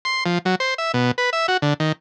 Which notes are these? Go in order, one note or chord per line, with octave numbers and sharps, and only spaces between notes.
C6
F3
F#3
C5
E5
B2
B4
E5
F#4
D3
D#3